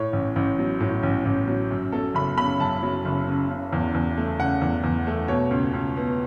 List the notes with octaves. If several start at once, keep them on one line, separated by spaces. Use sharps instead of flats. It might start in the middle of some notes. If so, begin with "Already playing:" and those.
Already playing: A2 C#5
A1
A1
F#3
A2
A1
A1
F#3
F#2
F#3 A4
F#1 B5
C#3 B5
F#2 A5
F#3
F#1
C#3
C#3
E2
E2
A3
C#3 F#5
E2
E2
A3
B2 C#5
C#2
C#2
B3